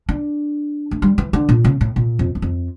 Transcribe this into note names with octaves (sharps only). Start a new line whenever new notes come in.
D4
A3
G3
E3
D3
A#2
C#3
A2
A#2
F2
E2
F2